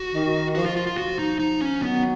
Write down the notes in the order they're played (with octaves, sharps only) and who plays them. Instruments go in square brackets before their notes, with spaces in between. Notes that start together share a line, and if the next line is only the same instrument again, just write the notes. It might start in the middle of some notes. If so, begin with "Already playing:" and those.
Already playing: [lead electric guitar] F#4
[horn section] D#3
[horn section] F3 [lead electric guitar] F#4
[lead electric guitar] F4
F4
F4
[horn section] F3 [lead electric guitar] F#4
[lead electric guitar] D#4
D#4
C#4
[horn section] D#3 F#3 [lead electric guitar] B3